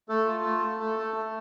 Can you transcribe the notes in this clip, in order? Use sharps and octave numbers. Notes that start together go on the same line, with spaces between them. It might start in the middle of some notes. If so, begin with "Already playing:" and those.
A3 A4
F4
A3
A3
A3
A3
A3